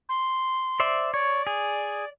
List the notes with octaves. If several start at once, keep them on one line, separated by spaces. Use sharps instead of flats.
C6
C5 D5 E5
C#5 D5
G#4